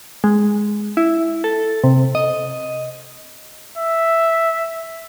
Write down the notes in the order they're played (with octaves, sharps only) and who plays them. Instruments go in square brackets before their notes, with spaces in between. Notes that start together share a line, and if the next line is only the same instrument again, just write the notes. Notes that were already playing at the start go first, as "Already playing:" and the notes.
[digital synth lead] G#3
E4
A4
C3
D#5
[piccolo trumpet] E5